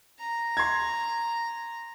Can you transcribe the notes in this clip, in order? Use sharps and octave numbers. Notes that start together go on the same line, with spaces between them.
A#5
C6 G#6